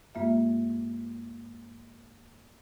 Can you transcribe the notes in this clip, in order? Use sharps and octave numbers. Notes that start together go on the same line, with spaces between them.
G2 G#3 A#3 F4 E5